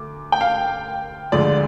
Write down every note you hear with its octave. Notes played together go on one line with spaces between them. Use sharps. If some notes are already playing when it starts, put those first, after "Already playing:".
Already playing: D2 D6
G5
F5
D2 D3 F3 G#3 D5